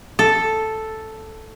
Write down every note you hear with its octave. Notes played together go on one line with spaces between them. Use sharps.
A4